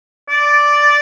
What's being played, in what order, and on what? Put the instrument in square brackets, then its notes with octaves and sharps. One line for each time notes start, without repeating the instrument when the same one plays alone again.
[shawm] D5